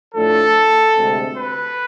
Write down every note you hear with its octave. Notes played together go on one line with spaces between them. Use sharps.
A2 F3 A3 D4 A4
D2 C3 G#3 C4
B4